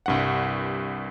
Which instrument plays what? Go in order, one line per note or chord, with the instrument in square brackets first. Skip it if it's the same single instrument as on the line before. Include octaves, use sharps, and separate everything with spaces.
[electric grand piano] C2 G2 F#5